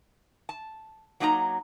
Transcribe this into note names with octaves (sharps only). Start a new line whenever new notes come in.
A5
F#3 A#3 D#4 G#5 A#5